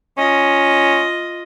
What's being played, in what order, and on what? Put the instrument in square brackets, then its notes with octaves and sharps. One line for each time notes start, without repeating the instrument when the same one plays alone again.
[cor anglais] C#4 [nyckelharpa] F4 D#5